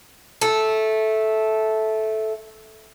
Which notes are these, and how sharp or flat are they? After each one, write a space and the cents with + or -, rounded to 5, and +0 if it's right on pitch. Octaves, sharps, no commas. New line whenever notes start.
A3 -10